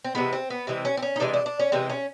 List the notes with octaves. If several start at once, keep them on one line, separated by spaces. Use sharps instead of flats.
C4
C3 E3 G#3 B3
C4
B3
C3 E3 G#3 C4
C#4
C4
C#4
D#4
C3 E3 G#3 D4
D4
D4
C#4
C3 E3 G#3 C4
C#4